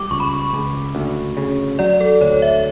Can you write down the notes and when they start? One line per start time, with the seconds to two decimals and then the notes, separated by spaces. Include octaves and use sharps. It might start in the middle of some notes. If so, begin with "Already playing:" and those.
Already playing: G3 D6
0.11 C#2 C#6
0.20 B5
0.29 C#6
0.53 C#2
0.95 D2
1.37 C#3
1.79 F#3 D5
2.01 A4
2.21 D2 C#5
2.42 E5